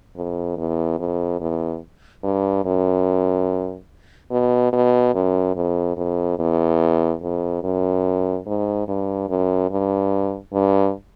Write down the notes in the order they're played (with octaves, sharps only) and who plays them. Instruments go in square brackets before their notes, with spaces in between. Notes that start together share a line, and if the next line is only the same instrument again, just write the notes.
[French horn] F2
E2
F2
E2
G2
F#2
B2
B2
F#2
F2
F2
E2
F2
F#2
G#2
G2
F#2
G2
G2